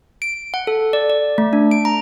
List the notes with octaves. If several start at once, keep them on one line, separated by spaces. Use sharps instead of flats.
D7
F#5
A4
D5
D5
A3
D4
D7
A#5